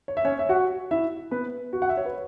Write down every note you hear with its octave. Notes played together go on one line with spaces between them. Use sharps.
C#5
E5
C#4 C#5
E5
F#4 F#5
E4 E5
B3 B4
F#4
F#5
E5
C#5
B4